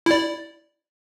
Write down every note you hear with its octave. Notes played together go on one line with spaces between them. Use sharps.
E4 D5